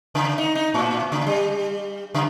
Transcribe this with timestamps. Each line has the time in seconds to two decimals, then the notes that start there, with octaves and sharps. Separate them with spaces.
0.15 C#3
0.38 D#4
0.55 D#4
0.74 A2
1.12 C#3
1.27 G3
2.15 C#3